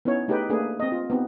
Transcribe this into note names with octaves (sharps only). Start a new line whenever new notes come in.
B3 C#4 D#4 E4 C#5
A3 D#4 G4 G#4 B4 G5
A3 A#3 D4 G#4 B4
C4 D#5
F4
B3 C4 D#4 G4